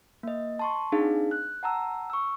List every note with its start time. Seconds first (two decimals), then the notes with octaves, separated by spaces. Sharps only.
0.23 A#3 D#5
0.59 A5 C6 C#6
0.92 C4 D4 D#4 G#4 F5
1.31 F#6
1.63 F#5 A5 A#5 E6
2.10 C#6 E6